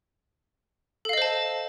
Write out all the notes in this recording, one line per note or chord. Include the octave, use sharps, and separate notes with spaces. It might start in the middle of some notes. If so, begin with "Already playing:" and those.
A4 C5 D#5 F5 A5